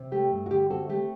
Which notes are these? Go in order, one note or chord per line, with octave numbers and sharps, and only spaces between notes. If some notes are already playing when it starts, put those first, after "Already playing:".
Already playing: C3
A3 G4
G2
F#4
D3 G4
C4 F#4 A4
A3 G4